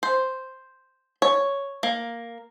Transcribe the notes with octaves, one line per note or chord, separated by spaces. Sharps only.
C5
C#5
A#3